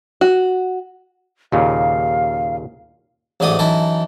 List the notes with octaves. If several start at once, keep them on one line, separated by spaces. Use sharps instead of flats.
F#4
D#2 A#2 C#3 F5
A1 G#2 F#3 A3 D5 D#6
F#2 E3 D#4 A4